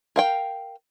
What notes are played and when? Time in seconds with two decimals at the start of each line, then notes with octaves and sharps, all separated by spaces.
0.16 A#4 F5 G5